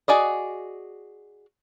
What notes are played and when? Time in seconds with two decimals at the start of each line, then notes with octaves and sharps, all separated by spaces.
0.08 F#4 G#4 D5 D#5